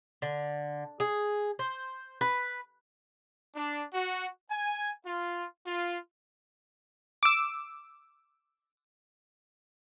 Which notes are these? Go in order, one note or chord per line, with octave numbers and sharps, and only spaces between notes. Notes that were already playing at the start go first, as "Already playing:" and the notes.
D3
G#4
C5
B4
D4
F#4
G#5
F4
F4
D6 E6